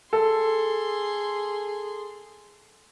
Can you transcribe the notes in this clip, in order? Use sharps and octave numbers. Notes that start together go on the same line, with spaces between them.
G#4 A4 C6